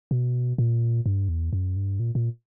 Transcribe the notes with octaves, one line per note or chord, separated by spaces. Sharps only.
B2
A#2
G2
E2
F#2
G2
A#2
A#2